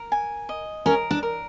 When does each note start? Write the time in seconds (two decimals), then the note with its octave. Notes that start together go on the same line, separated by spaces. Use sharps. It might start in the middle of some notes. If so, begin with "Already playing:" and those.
Already playing: A#4
0.12 G#5
0.49 D#5
0.86 C#4 A#4
1.11 D4
1.23 A#4